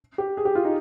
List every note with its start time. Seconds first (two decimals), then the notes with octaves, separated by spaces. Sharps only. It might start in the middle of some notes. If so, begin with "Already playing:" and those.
0.18 G4
0.37 G#4
0.45 G4
0.55 F4
0.65 D#4